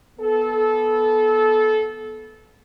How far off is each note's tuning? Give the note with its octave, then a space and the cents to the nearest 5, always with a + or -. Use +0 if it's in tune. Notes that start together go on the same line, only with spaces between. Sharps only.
B3 -15 A4 -20